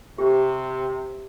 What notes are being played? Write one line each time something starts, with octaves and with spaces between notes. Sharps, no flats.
C3 G4